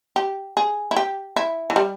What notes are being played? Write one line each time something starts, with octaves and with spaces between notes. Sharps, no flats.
G4
G#4
E4
G4
E4
E3
G3